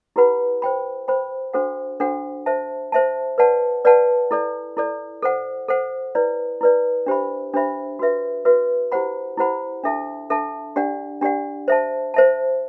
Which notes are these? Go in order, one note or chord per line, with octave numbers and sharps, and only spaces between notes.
E4 G4 B4 F#5 B5
C5 G5 B5
C5 G5 B5
D4 F#4 A4 C5 F#5
D4 F#4 A4 C5 F#5
C5 E5 A5
C5 E5 A5
B4 D5 F#5 A5
B4 D5 F#5 A5
E4 A4 D5
E4 A4 D5
A4 C5 F#5
A4 C5 F#5
E4 B4 D5
E4 B4 D5
D4 G4 C5 E5 B5
D4 G4 C5 E5 B5
F#4 B4 E5
F#4 B4 E5
E4 G4 C5 F#5 B5
E4 G4 C5 F#5 B5
D4 A4 E5 A5
D4 A4 E5 A5
D4 G4 D5 F#5
D4 G4 D5 F#5
C5 E5 A5
C5 E5 A5